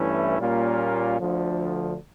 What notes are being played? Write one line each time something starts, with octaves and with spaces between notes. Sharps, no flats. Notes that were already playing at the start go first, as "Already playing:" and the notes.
Already playing: G2 E3 A3 C#4 E4
A#2 G3 A#3 C#4 F4
D2 D3 F3